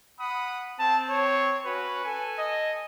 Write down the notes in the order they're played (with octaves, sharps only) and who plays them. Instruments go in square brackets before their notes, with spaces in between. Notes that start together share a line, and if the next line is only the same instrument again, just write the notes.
[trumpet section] F#5 B5 D#6
[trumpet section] C4 [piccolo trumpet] A5
[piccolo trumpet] C#5
[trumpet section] C#4 F#4 [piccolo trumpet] B4
[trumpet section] A4 G#5
[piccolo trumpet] D#5